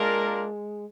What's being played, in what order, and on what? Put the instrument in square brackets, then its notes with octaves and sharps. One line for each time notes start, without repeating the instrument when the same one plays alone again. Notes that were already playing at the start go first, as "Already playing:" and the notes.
Already playing: [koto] G#3 [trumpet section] A#3 D4 F4 A#4